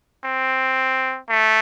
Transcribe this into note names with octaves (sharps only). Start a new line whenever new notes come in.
C4
A3